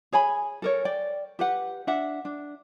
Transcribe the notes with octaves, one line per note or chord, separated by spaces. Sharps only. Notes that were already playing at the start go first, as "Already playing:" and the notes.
G#4 C#5 G#5 B5
A4 A#4 C#5
D5 G5
G4 B4 F#5
D4 E5 F#5
D4